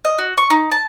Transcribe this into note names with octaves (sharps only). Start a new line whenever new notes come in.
D#5
F#4
C#6
D#4
A5